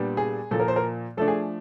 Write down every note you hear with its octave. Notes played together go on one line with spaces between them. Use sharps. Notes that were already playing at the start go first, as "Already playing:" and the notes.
Already playing: A#2 G3 B3 D4
G#4
A#2 F3 A#3 A4
A#4
C5
A#4
F3 A3 D4 A4
G#4